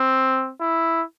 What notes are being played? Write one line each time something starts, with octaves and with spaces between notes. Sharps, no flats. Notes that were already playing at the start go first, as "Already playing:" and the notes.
Already playing: C4
E4